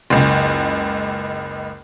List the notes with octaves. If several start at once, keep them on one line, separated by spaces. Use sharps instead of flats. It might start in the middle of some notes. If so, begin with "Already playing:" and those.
F#1 C#2